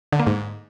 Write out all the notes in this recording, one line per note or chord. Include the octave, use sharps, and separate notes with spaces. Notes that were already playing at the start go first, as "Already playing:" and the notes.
D3
A#3
G#2